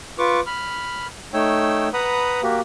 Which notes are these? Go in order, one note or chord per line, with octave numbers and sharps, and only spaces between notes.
F4 B4 C#6 D6
B5 F6
A3 D#4 C#5 G5 E6
B4 F#5 A#5 B5 D#6
A#3 F#4 G4